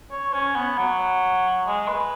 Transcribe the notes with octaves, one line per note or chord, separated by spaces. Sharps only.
C#5
C#4
B3
F#3
G#3
B4